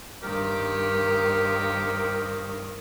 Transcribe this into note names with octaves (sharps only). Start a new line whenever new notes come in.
G2 D#3 G4 A#4 C5